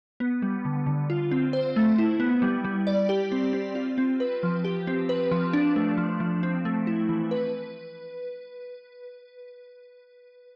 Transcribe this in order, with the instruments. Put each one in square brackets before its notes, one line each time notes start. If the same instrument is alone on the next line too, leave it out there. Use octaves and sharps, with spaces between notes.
[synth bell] B3
G3
D3
D3
F4
C4
C5
A3
E4
B3
G3
G3
D5
G4
C4
C4
F4
C4
B4
F3
G4
C4
B4
F3
D4
A3
F3
F3
C4
A3
E4
E3
B4